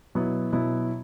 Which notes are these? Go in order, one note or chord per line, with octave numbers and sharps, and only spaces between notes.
B2 F#3 B3 E4
B2 F#3 B3 E4